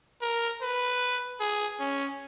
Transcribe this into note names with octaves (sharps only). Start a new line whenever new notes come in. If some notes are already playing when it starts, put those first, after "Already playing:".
A#4
B4
G#4
C#4